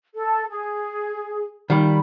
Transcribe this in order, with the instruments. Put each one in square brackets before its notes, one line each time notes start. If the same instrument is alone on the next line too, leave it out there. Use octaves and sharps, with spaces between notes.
[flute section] A4
G#4
[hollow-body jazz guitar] D#3 G3 [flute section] B5